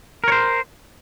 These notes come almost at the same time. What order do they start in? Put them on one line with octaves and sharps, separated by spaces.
A#4 C#5 C5